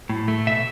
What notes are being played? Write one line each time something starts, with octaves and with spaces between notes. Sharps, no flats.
A2
A3
B2 E5